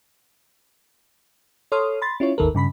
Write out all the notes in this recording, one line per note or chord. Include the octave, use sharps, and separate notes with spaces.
A4 C#5 C6 D#6 F6
B5 C6 A6
C#4 E4 F4 C#5
G#1 D#2 D#3 A4 A#4
G2 C#3 B5 B6